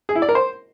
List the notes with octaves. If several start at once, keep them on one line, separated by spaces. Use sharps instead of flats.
G#4
E4
D5
A#4
C5